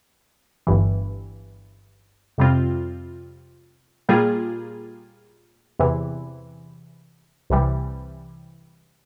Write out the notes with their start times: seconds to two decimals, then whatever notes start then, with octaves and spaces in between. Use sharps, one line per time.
0.67 G1 G2 E3
2.38 F2 C3 G3 C4 F4
4.09 A#2 G3 A#3 F4 G#4
5.79 E2 C3 E3
7.50 C2 C3 E3 G3